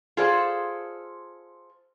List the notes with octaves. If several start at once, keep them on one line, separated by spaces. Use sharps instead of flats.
F4 G#4 A4 C5 D5